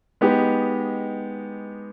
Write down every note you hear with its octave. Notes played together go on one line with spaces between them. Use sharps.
G#3 B3 D#4 G4 B4